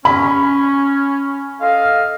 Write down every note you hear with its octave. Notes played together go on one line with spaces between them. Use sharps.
C#4 B5
A4 D#5 F5